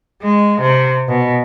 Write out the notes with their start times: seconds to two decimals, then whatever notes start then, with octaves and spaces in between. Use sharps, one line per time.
0.22 G#3
0.60 C3
1.09 B2